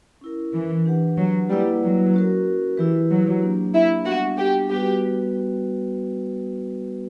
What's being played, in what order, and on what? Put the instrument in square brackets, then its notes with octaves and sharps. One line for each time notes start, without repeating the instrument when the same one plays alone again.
[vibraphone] C#4 E4 A#4
[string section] E3
[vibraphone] D4 G4 B4 F#5
[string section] F#3
[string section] G3 [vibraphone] A#3 E4 B4 F#5
[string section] F#3
[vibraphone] C#4 F#4 A#4
[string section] E3 [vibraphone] E4 G4 B4
[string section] F#3
[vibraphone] A#3 D4 G4
[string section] E4
[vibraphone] G3 B3 D4 [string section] F#4
[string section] G4
[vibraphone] G3 B3 F#4 B4 [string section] G4